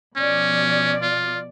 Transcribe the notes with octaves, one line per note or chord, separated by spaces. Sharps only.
B2 F3 C#4 D5
F4